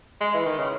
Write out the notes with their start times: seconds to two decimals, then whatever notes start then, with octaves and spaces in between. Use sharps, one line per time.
0.21 G#3
0.34 E3
0.46 D#3
0.58 C#3